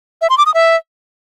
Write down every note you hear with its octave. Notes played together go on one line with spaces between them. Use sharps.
E5
C6
D6
D#6
E5